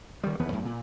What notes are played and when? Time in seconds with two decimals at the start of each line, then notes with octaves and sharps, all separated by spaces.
0.23 D#3 G3
0.39 D#2 E3 B3
0.52 F#2 A2
0.65 A#2